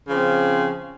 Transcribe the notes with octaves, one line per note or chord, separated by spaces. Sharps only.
C#3 F3 C4